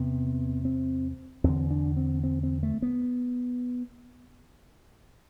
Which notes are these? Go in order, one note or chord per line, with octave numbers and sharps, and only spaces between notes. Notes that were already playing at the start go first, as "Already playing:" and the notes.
Already playing: E2 C3 B3
C4
E2 D3 C4
D4
C4
C4
C4
A3
B3